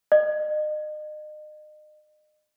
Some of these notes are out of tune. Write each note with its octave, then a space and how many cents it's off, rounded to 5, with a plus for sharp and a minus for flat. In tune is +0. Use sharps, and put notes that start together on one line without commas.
D#5 -35